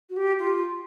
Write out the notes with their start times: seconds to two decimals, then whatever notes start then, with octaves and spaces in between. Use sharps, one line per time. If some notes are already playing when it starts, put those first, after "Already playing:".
0.09 F#4
0.16 G4
0.39 F4